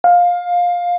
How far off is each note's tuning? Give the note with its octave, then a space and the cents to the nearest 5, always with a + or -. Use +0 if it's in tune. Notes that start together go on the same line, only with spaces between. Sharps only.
F5 +15